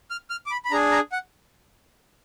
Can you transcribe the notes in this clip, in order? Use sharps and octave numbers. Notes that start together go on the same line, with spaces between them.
F6
F6
D6
B5
B5
D4 G#4 A#5
A#5
F#5